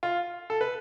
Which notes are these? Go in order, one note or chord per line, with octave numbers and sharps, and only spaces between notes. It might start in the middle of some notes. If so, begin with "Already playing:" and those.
F4
A4
B4